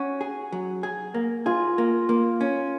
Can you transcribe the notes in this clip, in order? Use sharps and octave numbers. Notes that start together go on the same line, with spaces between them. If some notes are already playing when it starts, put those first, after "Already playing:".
Already playing: C#4 F#4
G#4
F#3
G#4
A#3
F4 G#4
A#3
A#3
C#4